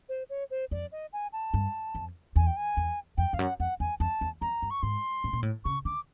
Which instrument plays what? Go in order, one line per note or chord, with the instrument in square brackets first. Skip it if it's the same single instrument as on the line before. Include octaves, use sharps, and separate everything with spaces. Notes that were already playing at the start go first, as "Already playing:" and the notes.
[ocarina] C5
C#5
C5
[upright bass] F2 [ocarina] D5
[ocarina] D#5
G#5
A5
[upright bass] G2
F2
[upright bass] E2 [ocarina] G#5
[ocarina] G5
G#5
[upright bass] E2
[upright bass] F2 [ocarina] G5
[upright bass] F2 [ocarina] F5
[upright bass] F#2 [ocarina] F#5
[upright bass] F2 [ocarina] F#5
[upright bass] E2 [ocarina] G#5
[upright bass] F2 [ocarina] A5
[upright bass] E2
[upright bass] F2 [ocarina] A#5
[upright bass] G2
[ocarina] C#6
[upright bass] G#2 [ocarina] C6
[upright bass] A2
A#2
A2
[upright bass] C#3 [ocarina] C#6
[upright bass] D3 [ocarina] D6